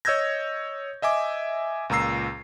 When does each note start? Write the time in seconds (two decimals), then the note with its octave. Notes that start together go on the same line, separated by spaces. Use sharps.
0.05 C#5 D#5 E6 G6 G#6 A#6
1.02 D#5 E5 G#5 D6
1.90 C#2 A#2 A#5 E6 C7